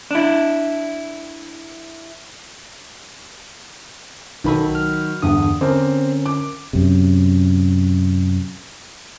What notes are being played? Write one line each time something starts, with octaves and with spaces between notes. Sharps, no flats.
D4 E4
B1 D#3 F#3 A4 B5
F6
E2 G2 D3 D#6
D3 C4 C#4 A#4
D6
F#2 C3